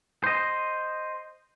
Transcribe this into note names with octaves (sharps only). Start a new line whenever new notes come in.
C5 D#5